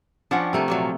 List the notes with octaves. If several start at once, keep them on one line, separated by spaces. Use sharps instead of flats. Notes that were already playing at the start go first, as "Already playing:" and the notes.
F3 C#4 D4 F#5 G5
C3 A3 A#3
A#2 F3 F#3